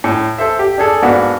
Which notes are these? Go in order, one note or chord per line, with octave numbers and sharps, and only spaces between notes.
A2
A4 C5 E5
G4
D4 G#4 A4
G#2 A#3 B3 D4 F#4